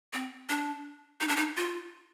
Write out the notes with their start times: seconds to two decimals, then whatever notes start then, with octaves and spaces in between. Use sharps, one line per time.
0.13 C4
0.49 D4
1.21 D#4
1.28 D4
1.36 D#4
1.57 F4